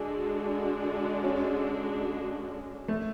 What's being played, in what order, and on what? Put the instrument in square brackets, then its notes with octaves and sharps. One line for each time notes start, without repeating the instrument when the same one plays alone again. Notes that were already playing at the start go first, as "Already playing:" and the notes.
Already playing: [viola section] D3 G#3 D4 F#4 [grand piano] G#4
[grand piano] C#4
A3